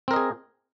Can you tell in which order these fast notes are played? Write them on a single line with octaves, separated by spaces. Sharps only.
C4 A#4 D#5 G#4